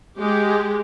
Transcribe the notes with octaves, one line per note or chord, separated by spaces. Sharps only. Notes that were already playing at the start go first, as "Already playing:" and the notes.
G#3 G4